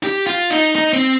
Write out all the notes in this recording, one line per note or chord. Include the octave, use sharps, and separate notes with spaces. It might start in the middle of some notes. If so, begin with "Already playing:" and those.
G4
F4
D#4
D#4
C4